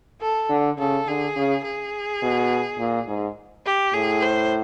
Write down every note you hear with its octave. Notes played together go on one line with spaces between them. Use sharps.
A4
D3
C#3 A4
D3 G#4
C#3
G#4
B2
A#2
G#2
G4
A2 G#4
C5